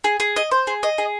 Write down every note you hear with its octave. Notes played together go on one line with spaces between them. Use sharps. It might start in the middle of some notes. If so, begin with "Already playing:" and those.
G#4
G#4
D#5
C5
G#4
D#5
G#4